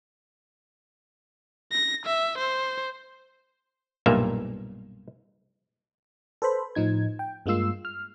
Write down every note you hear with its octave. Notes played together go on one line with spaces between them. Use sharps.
A#6
E5
C5
B1 G2 A#2 A#3 E5 F5
A4 B4 C5 B5
A2 F3 D#4 G#6
G5
G2 G#3 A#3 F4 E6 C7
F6